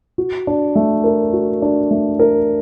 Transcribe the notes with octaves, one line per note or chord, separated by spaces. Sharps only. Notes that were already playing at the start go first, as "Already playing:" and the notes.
F#4
D4
A3
A#4
F#4
D4
A3
A#4